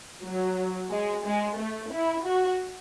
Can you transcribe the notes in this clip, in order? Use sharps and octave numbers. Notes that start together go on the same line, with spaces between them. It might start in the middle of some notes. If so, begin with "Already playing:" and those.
F#3
G#3
G#3
A3
E4
F#4